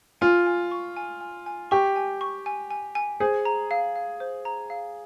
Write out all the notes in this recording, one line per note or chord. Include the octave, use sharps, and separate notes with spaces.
F4 G#5
G#5
C#6
G#5
G#5
G#5
G4 C#6
G#5
C#6
G#5
G#5
G#5
G#4 C5
A#5
F5
F5
C5
A#5
F5